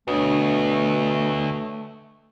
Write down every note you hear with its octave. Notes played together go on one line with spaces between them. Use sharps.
D2 B2 A3 D4 C#5 D#6